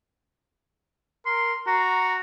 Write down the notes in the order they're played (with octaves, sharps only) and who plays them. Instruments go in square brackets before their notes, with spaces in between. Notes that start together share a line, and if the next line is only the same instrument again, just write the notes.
[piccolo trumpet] A#4 [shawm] C6
[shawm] F#4 [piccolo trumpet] A#5